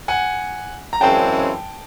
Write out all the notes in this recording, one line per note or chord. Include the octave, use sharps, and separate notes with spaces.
F#5 G#5
A#5
F#2 C#3 E3 G#3 C4 G5 A5